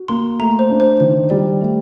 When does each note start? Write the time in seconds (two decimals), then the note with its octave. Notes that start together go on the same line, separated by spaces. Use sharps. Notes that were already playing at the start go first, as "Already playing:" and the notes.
Already playing: F#4
0.08 A#3 C6
0.39 A3 A#5
0.59 C5
0.70 D4
0.80 C5
1.00 D#3 C5
1.30 G3 D5
1.61 A3